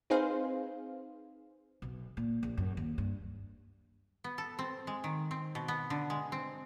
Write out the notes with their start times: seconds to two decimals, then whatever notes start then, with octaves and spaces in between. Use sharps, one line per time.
0.10 C4 D#4 G#4 B4 C5 F5
1.82 B1
2.17 A#2
2.43 A#1
2.57 F#2
2.77 D#2
2.98 G2
4.24 B3
4.38 A4
4.59 C4
4.87 G#3
5.04 D#3
5.31 C4
5.55 B2
5.68 B3
5.90 D3
6.10 G#3
6.32 C4